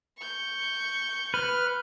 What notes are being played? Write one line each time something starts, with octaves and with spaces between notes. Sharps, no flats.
C#6 G6
B4 F6